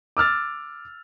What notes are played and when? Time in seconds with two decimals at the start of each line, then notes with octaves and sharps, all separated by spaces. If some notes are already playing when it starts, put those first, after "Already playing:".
0.17 D6 E6 F6 A6